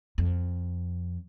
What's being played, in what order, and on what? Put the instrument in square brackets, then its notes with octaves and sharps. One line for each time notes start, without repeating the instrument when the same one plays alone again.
[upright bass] F2